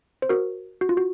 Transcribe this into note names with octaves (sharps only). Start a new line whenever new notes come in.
C5
F#4 A#4
F#4
F4
F#4